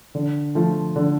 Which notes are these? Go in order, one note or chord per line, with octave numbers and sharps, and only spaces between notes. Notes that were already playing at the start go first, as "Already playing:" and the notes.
D3
F3 A3
D3